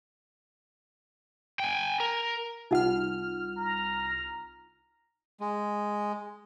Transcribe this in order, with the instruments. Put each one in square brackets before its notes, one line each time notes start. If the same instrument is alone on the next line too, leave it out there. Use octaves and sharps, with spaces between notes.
[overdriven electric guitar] G5 G#5
A#4
[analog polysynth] C2 F6 [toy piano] D#4 F4 F#5
[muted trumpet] A#5
[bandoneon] G#3